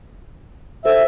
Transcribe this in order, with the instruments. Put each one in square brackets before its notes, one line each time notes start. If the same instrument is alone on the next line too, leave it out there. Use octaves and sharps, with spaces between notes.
[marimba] A4 C5 [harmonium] E5